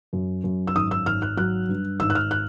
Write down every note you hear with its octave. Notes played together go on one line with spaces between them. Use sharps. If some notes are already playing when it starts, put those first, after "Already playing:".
F#2
F#2
E6
G#1 D#6
E6
G#1 F6
F#6
F#3 F#6
G2
G#1 E6
F#6
F6
F#6